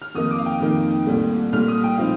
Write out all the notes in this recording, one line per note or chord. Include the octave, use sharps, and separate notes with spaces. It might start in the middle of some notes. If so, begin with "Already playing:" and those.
F6
F2 D#3 A#3 D#4 D#6
D6
F5
G5
F2 D#3 A#3 D#4
C2 A#2 A3
C2 A#2 A3 F6
D#6
G5
A2 F3 C4 D#4 F5